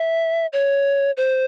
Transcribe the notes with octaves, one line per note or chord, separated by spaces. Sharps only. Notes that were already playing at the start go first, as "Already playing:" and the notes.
Already playing: E5
C#5
C5